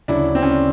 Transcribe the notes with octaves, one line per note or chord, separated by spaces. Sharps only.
D2 C#3 F#3 D4 E4
C4
C#4
D4